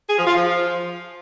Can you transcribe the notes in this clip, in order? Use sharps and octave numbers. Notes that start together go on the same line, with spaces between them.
G#4
F3
F4
F3